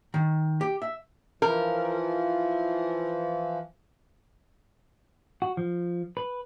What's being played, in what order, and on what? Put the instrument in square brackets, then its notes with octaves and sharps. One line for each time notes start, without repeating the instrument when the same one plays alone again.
[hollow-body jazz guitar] D#3
G4
E5
[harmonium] E3 F3 [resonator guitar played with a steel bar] A#4
[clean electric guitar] F#4
F3
B4